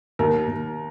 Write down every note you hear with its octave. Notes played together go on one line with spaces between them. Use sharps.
D#2 A#4
D#2